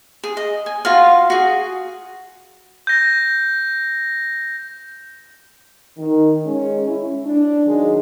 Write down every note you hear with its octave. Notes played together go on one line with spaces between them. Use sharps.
G#4
D#5
G#5
F4 F#4 F5
F#4 G#4
G6 A#6
D#3
G#3 C#4
C#4 E4
D4
D#3 F#3 G#3